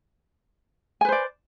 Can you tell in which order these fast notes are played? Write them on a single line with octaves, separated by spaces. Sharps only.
G#5 B4 C5 D5